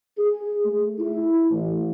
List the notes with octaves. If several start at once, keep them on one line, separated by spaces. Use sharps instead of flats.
G#4
A3
E4
A1